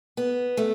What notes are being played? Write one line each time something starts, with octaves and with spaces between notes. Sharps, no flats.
B3
A3